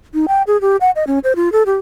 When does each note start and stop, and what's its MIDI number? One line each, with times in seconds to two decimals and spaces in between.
0.14 0.26 63
0.28 0.42 79
0.47 0.60 68
0.61 0.77 67
0.81 0.91 78
0.96 1.04 75
1.07 1.19 61
1.24 1.36 72
1.36 1.52 65
1.52 1.63 69
1.66 1.76 67